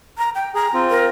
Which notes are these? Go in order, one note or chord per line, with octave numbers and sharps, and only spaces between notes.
A#5
G5
G#4 A#5
C4 F4
A#4